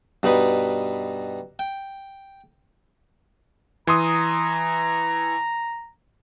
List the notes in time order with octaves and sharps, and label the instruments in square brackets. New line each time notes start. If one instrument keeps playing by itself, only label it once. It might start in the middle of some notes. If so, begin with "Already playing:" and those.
[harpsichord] G2 B2 D#4 B4
G5
[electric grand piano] E3 C6 D#6 [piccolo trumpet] A#5